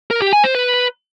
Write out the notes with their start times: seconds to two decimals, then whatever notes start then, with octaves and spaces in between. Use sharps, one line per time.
0.11 A#4
0.22 G4
0.33 G#5
0.44 C5
0.55 B4